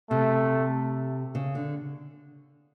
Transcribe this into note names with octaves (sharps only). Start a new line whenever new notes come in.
C3 A3
C#3
D3